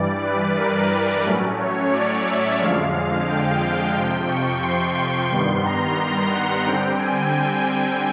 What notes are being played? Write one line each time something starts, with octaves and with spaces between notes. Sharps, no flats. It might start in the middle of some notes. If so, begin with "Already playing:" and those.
Already playing: G2 E3 G3 D5
B4
A#4
A2 F#3 A3 C#4
C#5
D5
E5
F2 D3 F3 G#3 F5
G5
F2 C3 F3
C#6
C6
G2 D#3 G3 B3
A#5
F#5
D3 G3 C4 G5
G#5
G#5